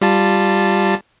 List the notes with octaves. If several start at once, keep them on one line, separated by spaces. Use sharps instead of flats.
G3 F4 A5